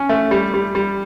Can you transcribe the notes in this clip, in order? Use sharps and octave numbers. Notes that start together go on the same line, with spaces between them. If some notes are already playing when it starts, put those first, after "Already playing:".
Already playing: C#4
A3
G3
G3
G3